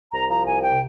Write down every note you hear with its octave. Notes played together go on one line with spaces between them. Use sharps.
C2 A#5
F3 A#5
C2 G#5
C3 G5